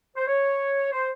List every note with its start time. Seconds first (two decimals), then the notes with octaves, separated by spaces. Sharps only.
0.16 C5
0.27 C#5
0.92 C5